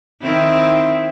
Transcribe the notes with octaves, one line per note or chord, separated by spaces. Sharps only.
D#3 C4 E4